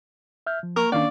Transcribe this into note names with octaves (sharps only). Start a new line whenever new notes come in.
E5 F6 G6
F3
A#3 A#4 C#6
D#3 A#3 C#4 D4 D5 F5